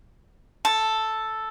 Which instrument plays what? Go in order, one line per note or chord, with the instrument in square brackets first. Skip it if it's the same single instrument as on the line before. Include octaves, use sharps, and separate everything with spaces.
[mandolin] A4